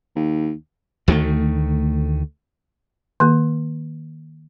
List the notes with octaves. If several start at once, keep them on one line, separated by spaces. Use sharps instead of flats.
D#2
D2 D#3 E3 A3
D#3 A#3